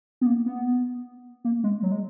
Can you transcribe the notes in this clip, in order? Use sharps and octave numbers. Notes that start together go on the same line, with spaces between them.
B3
A#3
B3
A#3
G#3
F#3
G#3